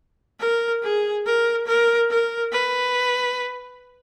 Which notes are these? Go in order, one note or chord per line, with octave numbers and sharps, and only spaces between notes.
A#4
G#4
A#4
A#4
A#4
B4